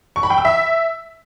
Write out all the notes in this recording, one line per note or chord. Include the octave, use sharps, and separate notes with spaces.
C#6
B5
G5
E6
E5